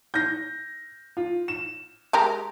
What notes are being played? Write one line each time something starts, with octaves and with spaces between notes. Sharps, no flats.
G6 A#6
F4
E7
G#3 G4 A#4